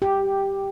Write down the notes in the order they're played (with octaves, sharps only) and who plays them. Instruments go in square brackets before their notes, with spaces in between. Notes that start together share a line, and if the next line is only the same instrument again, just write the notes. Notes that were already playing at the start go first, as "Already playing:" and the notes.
[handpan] G4